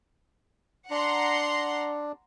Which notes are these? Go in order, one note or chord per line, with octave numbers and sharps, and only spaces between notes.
D4 F#5 A#5 C6